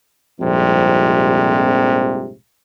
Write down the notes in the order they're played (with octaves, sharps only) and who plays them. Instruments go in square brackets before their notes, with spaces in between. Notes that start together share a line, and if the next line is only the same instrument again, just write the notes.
[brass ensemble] A#1 F2 G#2 C3 G3